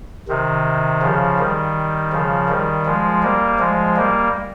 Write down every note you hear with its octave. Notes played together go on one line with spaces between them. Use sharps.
C3 D#3
C#3 F3
D#3 G3
C#3 F3
D#3 G3
F3 G#3
G3 A#3
F3 G#3
G3 A#3